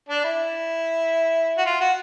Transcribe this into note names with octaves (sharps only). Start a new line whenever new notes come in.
D4
E4
F#4
F4
F#4